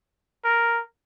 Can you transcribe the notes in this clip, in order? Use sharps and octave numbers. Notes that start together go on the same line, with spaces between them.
A#4